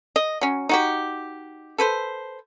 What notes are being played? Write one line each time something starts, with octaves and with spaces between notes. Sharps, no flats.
D#5
F#3 C#4
D#4 F#4 G4
A4 B4 C5